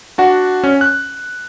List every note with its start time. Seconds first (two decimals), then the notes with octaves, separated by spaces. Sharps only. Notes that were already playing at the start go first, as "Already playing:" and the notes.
0.18 D4 F#4 F#5
0.64 C#4
0.81 F#6